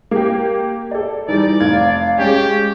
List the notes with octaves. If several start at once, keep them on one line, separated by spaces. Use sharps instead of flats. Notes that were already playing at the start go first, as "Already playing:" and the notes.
A#3 G4
A4 D5
E3 G3 D#4 D5
F1 F5 G#6
G#3 C#4 G4